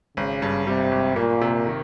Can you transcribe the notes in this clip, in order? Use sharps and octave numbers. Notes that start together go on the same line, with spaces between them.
G#1 C#3
G2
C3 G3
G#1
A#2 A#3
C3
D#3